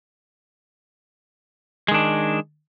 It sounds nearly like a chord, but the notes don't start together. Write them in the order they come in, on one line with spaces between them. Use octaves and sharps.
G#3 D#3 D4